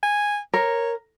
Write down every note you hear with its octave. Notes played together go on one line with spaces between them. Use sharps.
G#5
A#4 C#5